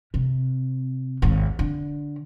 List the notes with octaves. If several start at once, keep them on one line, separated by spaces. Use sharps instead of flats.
C3
G#1 D#2
D3